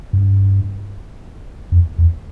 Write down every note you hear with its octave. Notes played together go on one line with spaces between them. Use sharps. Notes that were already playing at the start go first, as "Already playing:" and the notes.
G2
F2
E2